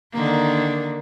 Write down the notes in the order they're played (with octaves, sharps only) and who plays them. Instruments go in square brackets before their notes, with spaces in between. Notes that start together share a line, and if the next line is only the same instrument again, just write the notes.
[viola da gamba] D3 D#3 A#3